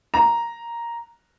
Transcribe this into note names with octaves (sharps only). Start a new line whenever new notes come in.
A#5